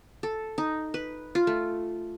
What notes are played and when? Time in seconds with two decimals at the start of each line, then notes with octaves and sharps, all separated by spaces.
0.23 A4
0.58 D#4
0.94 B4
1.35 F4
1.47 A3